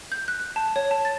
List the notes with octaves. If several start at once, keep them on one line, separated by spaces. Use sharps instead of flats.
G6
F#6
A5
C#5
A5
A6